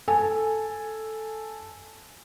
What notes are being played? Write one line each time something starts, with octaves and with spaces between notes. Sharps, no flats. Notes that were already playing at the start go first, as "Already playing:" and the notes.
A4 G#5